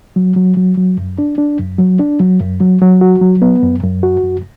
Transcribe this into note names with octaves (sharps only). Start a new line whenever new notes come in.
F#3
F#3
F#3
F#3
F#2
D4
D4
F#2
F#3
D4
F#3
F#2
F#3
F#3
F#4
F#3
B3
F#2
F#2
F#4
F#2